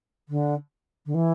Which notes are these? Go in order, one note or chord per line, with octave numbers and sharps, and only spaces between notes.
D3
D3
E3